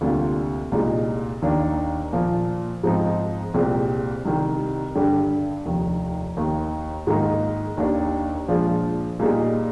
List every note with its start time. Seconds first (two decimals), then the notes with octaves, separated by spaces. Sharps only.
0.01 D2 C3 G3 A#3 F4
0.72 C2 A#2 G#3 D#4
1.42 D#2 D#3 A#3 D4
2.13 A#2 F3 A#3
2.83 G#2 F3 C4 D#4
3.54 C2 A#2 G#3 C4 G4
4.25 C2 C3 D#3 G3
4.95 G2 D3 G3 D4 G4
5.65 F1 D#2 D#3
6.37 D#2 D#3 A#3
7.07 G#2 D#3 A#3 D#4 A#4
7.77 D#2 D#3 A#3 D4 G4
8.48 A#2 F3 G#3 D4 F4
9.19 A#2 G3 A#3 D#4 G#4